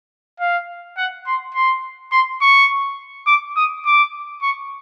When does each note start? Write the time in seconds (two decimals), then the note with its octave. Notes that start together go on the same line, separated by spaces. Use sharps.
0.40 F5
0.97 F#5
1.26 C6
1.54 C6
2.12 C6
2.41 C#6
3.27 D6
3.56 D#6
3.86 D6
4.42 C#6